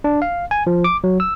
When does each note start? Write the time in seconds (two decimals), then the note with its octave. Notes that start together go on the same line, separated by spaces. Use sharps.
0.04 D4
0.22 F5
0.51 G#5
0.67 F3
0.84 D6
1.04 F#3
1.20 E6